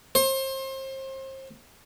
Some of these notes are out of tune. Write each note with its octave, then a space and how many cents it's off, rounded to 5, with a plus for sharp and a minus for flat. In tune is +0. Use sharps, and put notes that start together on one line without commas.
C5 +35